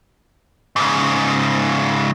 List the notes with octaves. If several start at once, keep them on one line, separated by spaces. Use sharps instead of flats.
G#2 C#3